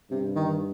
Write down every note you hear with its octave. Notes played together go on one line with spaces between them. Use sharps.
G2 C3
D#3